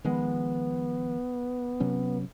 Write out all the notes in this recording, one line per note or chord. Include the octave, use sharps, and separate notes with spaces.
D#3 F3 G#3 B3
C3 F#3 C#4